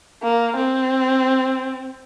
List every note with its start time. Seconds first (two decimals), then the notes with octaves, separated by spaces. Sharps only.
0.23 A#3
0.57 C4